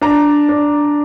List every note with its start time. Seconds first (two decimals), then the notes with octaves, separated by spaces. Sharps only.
0.01 D4 A#5
0.49 D4